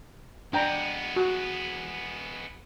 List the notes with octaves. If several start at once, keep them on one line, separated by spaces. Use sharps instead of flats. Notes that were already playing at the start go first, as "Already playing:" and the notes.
G#3 B3 D4 G5 A#5
F#4